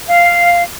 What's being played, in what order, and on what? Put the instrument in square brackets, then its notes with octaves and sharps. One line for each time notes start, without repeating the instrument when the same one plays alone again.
[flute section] F5